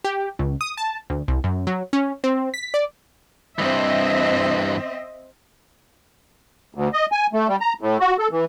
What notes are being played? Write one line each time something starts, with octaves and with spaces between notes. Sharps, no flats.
G4
C#2
D#6
A5
D2
C2
F#2
F#3
C#4
C4
B6
D5
G2 E3 C4 D#5 E5
D2
D#5
G#5
A3
G3
A#5
A2
F#4
A4
E3